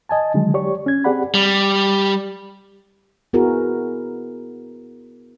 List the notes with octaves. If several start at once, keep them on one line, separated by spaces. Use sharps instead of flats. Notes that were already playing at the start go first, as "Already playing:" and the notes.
D#5 G#5 A5
D3 D#3 F#3 G#3
G4 C#5 D5 C#6
C#4 G#6
C4 G4 G#4 D5 F#5 B5
G3
B3 E4 F#4 G#4 A#4